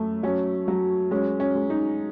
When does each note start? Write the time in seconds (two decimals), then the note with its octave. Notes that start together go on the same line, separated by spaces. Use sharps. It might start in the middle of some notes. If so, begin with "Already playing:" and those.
Already playing: F#2 A3
0.23 F#3 C#4
0.68 F#3
1.11 G#3 C#4
1.40 C#4
1.55 G#3
1.70 D#4